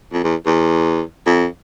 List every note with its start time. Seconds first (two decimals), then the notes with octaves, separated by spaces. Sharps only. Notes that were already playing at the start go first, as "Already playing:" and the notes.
0.13 F2
0.24 E2
0.46 E2
1.26 F2